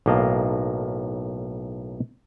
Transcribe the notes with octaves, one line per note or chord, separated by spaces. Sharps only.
B1 A2 A#3 D#5 F5 A5